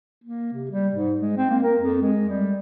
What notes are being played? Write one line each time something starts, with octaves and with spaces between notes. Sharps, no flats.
A#3
C3
G3
G#2
G#3
C4
A#3
A#4
F2
G#3
G3